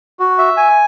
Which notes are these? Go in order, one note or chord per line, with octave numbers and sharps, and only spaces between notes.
F#4
E5
G#5